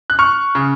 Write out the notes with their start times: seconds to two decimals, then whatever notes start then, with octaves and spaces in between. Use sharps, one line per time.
0.10 F#6
0.19 C#6 F6
0.55 C#3